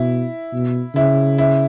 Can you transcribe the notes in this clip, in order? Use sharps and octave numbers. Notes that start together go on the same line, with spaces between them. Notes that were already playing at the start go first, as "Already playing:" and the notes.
Already playing: B2 E4
B2
C#3 E4
E4